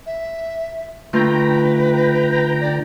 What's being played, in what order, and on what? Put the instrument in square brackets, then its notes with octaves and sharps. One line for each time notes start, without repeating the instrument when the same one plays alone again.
[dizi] E5
[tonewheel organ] D3 G5 A#5 [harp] A3 F4 [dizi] B4
[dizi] D5